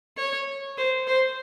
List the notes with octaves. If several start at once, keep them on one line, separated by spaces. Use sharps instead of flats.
C#5
C5
C5